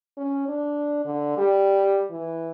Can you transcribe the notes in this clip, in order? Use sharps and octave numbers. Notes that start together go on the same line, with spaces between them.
C#4
D4
D3
G3
E3